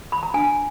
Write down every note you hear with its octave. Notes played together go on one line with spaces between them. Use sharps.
B5
A#5
D4 G#5